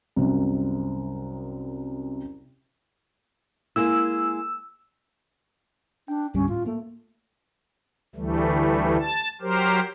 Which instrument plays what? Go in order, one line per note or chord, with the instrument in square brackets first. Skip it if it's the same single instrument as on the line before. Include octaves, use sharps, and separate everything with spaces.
[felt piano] C2 F#2 C3
[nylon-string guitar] G#3 A#3 E4 [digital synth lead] E6
[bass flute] D4 [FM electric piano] G5
[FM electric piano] D2 G#2 G3 [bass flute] C#4
[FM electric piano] A2 [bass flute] F4
[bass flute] A3 [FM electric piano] A#3
[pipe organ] D2 E3 G3 A3
A5
F#3 G4 A#4 C5